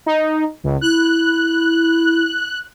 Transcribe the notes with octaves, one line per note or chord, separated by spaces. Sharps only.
D#4
C#2
E4 F#6